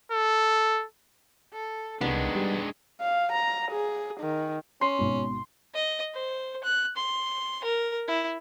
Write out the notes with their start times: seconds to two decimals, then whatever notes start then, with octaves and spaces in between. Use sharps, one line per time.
0.12 A4
1.53 A4
2.01 C2 D#3 G#3 B3 D4
2.35 G3
3.00 F5
3.32 A#5
3.71 G#4
4.20 D#3
4.81 C#4 C6
4.99 G#1 B2
5.75 D#5
6.14 C5
6.63 F#6
6.97 C6
7.64 A#4
8.08 E4